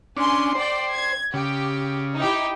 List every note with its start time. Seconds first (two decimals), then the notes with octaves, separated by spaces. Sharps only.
0.17 C#4 D4 G#5 C6
0.55 C5 D5 G5
0.92 G#6
1.34 C#3 G4
2.17 D#4 E4 G4